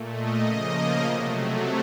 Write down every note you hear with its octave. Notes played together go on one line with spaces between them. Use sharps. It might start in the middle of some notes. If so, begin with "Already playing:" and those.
Already playing: A#2 A3
D#5
C#3 F3 A#3
C3 F#3 A3